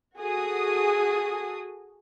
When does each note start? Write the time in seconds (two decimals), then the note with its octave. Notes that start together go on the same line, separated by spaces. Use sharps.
0.20 F#4 G#4 A4 D#6